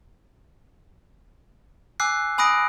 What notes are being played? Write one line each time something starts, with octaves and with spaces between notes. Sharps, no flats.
G#5 D6 E6 F#6 C7
G#5 B5 D#6 F#6 A#6 D7